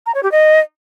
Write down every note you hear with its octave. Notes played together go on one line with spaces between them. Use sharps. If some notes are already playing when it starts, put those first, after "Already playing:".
A#5
C#5
G4
D#5